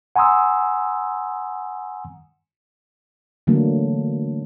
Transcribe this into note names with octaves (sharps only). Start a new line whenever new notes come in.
F#5 G#5 A#5 C6 D#6 E6
D3 E3 F#3 A3 A#3 D4